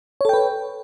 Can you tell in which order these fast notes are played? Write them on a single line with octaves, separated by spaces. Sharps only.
C#5 A4 G5 B4